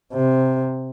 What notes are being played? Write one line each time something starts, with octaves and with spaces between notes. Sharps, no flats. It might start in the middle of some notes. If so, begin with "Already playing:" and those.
C3